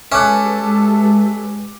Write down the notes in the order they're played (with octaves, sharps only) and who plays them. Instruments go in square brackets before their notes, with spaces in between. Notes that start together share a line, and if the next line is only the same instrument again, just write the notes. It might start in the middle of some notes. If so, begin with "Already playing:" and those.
[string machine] G#3 G4 B4 [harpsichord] C#4 [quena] A4 [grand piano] E5 D6 F#6